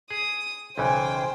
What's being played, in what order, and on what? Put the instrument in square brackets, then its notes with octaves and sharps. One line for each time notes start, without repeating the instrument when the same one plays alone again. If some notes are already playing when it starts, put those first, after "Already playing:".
[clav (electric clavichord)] G#4 [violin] D#6
[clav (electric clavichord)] B1 C#3 E3 [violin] C5 G5 [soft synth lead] G#5